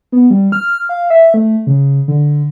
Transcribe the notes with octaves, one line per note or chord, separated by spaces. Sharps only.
B3
G3
F6
F5
E5
A3
C#3
D3